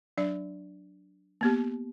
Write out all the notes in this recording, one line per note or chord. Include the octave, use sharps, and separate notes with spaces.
F#3 D4 D5
A#3 B3 G4